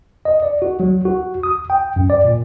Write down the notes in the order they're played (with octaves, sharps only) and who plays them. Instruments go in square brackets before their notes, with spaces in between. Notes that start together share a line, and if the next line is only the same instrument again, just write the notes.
[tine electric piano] D#5
D5
F#4
F#3
F#4
D#6
G5
F#2
D5
A#2